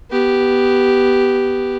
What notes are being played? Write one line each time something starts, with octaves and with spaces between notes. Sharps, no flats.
B3 G4